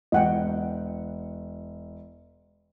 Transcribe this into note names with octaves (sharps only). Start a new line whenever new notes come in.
E1 D#5 F#5 G5